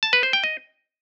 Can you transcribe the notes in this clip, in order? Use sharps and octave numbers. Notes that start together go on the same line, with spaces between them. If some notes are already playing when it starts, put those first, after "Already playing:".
A5
B4
C5
G5
D#5